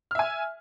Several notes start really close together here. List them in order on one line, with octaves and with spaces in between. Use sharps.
F6 E5 G#5